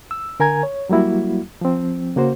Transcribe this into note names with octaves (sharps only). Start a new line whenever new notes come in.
E6
D3 A#4 G#5 A#5 G#6
C#5
F#3 G3 A#3 E4 F#4
F3 C4
C#3 A#3 F#4 C5